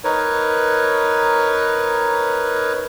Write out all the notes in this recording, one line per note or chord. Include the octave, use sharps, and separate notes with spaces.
D#4 A#4 B4 C#5